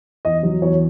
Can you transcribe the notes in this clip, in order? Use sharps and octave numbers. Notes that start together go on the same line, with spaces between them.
E2 D#5
F#3
E2 C#5